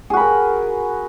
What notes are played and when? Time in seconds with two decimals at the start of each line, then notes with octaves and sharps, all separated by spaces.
0.10 G#4
0.13 F#4
0.17 B5
0.20 A#4